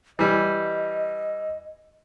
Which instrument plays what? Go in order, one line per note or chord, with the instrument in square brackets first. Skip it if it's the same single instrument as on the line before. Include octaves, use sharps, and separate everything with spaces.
[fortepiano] E3 G3 [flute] D#5